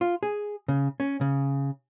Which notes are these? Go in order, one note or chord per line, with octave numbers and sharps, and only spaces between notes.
F4
G#4
C#3
C#4
C#3